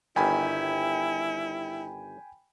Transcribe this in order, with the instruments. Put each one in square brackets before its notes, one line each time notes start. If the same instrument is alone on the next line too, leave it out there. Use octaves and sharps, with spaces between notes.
[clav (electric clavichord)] G1 D#3 [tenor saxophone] E4 [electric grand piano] G5 G#5 B5